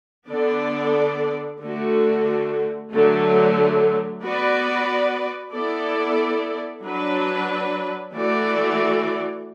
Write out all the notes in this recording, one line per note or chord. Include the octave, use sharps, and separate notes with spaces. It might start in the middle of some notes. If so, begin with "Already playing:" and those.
D3 B3 D4 A4 D5
D3 A3 F#4
D3 F#3 A3
B3 F#4 B4 D5
B3 E4 A4 D5
F#3 D4 B4
E3 A3 F#4 D5